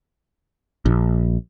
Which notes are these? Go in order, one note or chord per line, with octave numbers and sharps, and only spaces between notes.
A#1